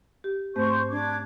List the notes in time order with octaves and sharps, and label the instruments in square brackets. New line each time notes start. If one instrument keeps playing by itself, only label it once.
[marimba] G4
[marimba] G#2 A3 C4 [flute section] C5 C#6 G6
[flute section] D4 D6 G#6